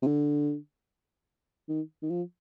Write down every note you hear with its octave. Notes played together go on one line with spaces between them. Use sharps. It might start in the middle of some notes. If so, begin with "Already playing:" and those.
C3
D3
D#3
D#3
F3